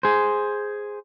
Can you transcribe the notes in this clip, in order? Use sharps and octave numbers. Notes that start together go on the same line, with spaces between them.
G#4 C5